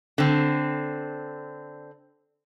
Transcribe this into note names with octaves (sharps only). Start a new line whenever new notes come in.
D3 C4